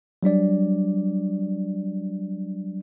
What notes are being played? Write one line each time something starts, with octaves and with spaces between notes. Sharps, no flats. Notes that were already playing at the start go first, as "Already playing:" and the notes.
F#3 G3 D4 D5